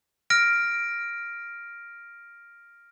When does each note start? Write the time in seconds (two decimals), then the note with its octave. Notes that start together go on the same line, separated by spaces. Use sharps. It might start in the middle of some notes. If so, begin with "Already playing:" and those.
0.30 F6 A#6 D7